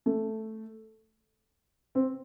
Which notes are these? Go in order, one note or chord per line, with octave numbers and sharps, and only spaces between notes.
A3
C4